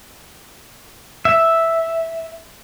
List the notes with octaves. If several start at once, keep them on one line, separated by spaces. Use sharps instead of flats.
E5